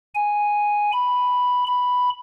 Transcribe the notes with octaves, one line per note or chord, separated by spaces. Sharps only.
G#5
B5
B5